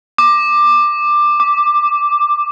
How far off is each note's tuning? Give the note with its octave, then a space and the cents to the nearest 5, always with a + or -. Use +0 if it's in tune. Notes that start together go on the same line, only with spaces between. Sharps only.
D6 +15
D6 +0